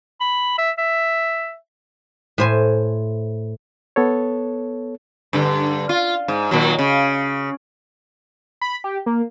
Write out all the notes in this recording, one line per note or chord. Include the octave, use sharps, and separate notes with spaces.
B5
E5
E5
A2 C5 G#5
B3 A4 C#5
G2 D3
F4
G#2
A#2 D#3 F#3
C#3
B5
G4
A#3